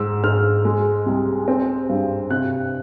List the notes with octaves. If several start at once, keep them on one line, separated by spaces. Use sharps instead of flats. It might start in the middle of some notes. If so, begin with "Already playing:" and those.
Already playing: G#2 E6
G#2 F6
G#3
C2
C4
G2
C3 F#6